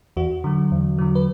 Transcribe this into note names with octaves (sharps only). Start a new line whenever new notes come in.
E2 F#4
D3 F#3
E2
D3 F#3
B4